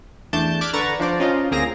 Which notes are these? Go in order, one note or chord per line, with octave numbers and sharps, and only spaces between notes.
E2 A3 D4 A5 G6
D6 F6 F#6 G#6 B6 D7
D3 B4 A#5 C#6 A6
F3 D4 C5 D5
C#4 D#4 F4 C5 D#5
D2 A#3 C4 G#4 A#5 A#6